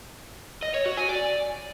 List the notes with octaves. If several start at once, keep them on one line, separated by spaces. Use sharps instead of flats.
D#5
C#5
F#4
G#5
D5